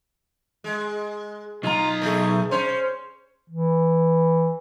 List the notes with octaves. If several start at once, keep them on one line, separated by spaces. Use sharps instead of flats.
G#3
B1 D#4 F4 A#5
A3 G#4
C#4 C5
E3